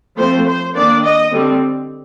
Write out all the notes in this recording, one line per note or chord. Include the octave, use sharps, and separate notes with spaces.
F3 A3 C4 C5
C5
D#3 A#3 D4 D5
D#5
D3 G3 C4